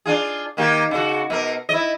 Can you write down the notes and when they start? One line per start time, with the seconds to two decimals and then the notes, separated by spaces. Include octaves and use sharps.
0.06 D4 F4 G#4
0.57 D#3 A#3 G4
0.91 C#3 F#4
1.30 B2 A#4
1.69 E4 D#5